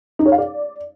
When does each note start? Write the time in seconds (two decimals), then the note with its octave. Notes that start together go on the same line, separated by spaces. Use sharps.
0.19 D#4
0.26 C#5
0.32 F5
0.38 D5